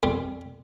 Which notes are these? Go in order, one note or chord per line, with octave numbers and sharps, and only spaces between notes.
F2 G3